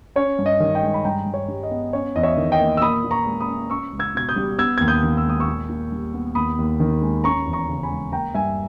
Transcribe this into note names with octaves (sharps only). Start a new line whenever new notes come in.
C#4 C#5
G2
D#5
D#3
D#5 G5
G#3
B5
G2 G5 A#5
G2
C#5
G3
D#5
B3
C#4 C#5
E2 D#5
C#5 E5
D#3
D#5 G5
A#3
E6
A#2 B5 D#6
A#2
A#5 C#6
G#3
B5 D#6
C#4
C#4 C#6 E6
C#2
E6 G#6
B2 G#6
D#6 G6
G3
B3 E6 G#6
D#2 G#6
D#6 G6
D#3
E6
G#3 D#6
C#6 E6
A#2
A#2
G3
B3
D#2 B5 D#6
D#2
D#3
G#3
C#4 A#5 C#6
E2
A#5 C#6
C#3
G#5 B5
G#3
A#3 G5 A#5
G2 E5 G#5